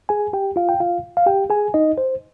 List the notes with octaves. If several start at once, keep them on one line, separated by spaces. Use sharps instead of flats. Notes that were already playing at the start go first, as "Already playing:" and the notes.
G#4 G#5
G4 G5
F4 F5
G5
F4 F5
F5
G4 G5
G#4 G#5
D#4 D#5
C5